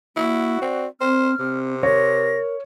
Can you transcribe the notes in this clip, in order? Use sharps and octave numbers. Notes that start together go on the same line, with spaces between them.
A#3 E4 F#4
C4 D5
C4 C5 F6
C3 C4
A#4 C#5 A#6